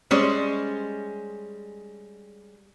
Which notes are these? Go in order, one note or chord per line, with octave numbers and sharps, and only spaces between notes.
G3 G#3 C#4 C5